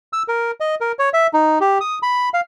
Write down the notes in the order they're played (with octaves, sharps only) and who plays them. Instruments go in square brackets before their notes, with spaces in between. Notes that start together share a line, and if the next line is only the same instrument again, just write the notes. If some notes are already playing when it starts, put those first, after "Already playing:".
[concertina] E6
A#4
D#5
A#4
C#5
E5
D#4
G4
D#6
B5
F5